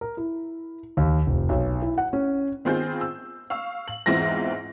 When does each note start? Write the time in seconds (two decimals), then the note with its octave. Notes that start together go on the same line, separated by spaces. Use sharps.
0.01 A#4
0.17 E4
0.97 D#2
1.27 F1
1.49 B1
1.82 E4
1.98 F#5
2.13 C#4
2.65 D#3 B3 C4 F4 G#4 G6
3.01 E6
3.50 F5 C#6 E6
3.88 F#7
4.06 E2 G#2 E3 C4 F4 A#6